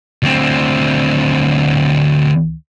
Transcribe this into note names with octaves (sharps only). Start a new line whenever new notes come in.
D2 C4